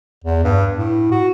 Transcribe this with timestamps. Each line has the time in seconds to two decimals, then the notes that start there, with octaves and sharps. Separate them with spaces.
0.24 E2
0.44 G2
0.78 A2
1.12 F#4